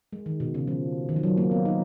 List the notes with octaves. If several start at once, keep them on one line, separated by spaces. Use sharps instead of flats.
G#3
D#3
B2
C#3
F3
D#3
F3
F#3
A#3
B3
D#4